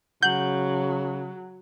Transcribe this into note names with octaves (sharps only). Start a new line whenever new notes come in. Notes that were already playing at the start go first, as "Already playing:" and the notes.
C#3 F#3 F#5 G6 F#7